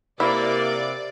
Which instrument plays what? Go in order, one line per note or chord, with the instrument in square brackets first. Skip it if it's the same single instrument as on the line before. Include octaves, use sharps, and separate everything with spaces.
[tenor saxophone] C3 [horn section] A#3 [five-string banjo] E4 [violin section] D5